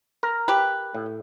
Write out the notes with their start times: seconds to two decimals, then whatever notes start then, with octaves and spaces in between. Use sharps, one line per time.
0.23 A#4
0.48 G4 B4
0.95 A2